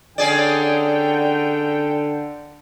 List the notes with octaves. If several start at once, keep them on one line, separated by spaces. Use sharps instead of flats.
D3 C#4 G#4 D5 G5